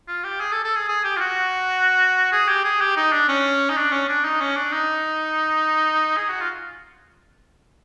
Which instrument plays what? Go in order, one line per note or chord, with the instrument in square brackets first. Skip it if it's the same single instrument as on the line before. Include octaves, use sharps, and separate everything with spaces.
[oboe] F4
G4
G#4
A4
A4
G#4
G#4
G4
F4
F#4
G#4
G4
G#4
G4
D#4
D4
C#4
D#4
D4
C#4
D4
D#4
C#4
D4
D#4
G#4
F#4
F4